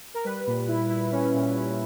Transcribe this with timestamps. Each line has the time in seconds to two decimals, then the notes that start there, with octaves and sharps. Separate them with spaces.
0.14 A#4
0.25 G3 B4
0.47 A#2
0.68 E4
0.90 E4
1.12 C#4
1.34 A#2
1.54 C#4